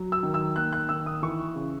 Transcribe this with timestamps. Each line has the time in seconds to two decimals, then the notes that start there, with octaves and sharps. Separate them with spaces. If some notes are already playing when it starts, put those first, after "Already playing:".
Already playing: F#3
0.12 E6
0.23 D#3
0.34 E6
0.56 A#3 F#6
0.73 F#6
0.89 D#3 E6
1.06 D#6
1.22 E3 C#6
1.56 C#3